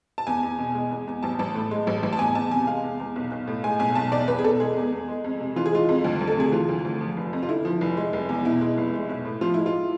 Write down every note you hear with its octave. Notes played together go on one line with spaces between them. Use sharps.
A5
E2 G#5
E2
B2
G#3
E2
E2
A1 A5
A1 A5
A2
G#3
A1
A1
A5
E2 G#5
E2 A5
C3 G#5
G#3 F5
E2
E2
B1
B1
A2
G#3 G#5
B1 G#5
B1 A5
E2 D5
E2 B4
G#4
B2 A4
G#3 G#4
E2
E2
G#3
F2
C3
E3 F4
G#4
G#3 F4
F2
D2
D2
A4
C3 G#4
E3 F4
D2
D2
F3
F1
F2
F4
D3 E4
F3
F1
G#3
F1
E2
B2 E4
G#3
F1
G#3
B1
A2
F3 F4
G#3 E4
F4